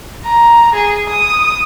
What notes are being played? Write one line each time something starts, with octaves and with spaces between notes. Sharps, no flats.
A#5
G#4
D#6